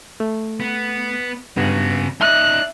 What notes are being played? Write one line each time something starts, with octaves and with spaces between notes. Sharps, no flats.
A3
B3
G2 C#3 B3 F#4 G#6
D#4 D5 E5 F#6